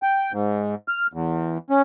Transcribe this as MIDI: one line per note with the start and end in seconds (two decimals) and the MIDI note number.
0.03 0.32 79
0.32 0.75 44
0.88 1.07 89
1.13 1.58 40
1.70 1.82 61